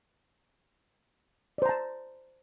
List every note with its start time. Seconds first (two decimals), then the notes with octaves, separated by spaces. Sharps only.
1.58 D5
1.62 C5
1.66 A#5
1.69 A5